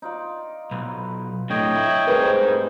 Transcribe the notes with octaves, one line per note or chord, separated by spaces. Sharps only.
D#4 F4 D5
B1 B4
A2 D3 C#5 D#5 G5
A3 E4 E5
C3 G3 C4 D#4 G#4 A#4 B4